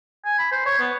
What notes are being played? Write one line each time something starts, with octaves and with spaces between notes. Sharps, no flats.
G#5
B5
C5
C#5
B3